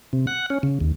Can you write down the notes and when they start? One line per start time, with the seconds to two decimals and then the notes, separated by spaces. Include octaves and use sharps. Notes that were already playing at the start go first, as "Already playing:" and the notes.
0.13 C3
0.27 F#5
0.50 C#4
0.63 C#3
0.81 D#2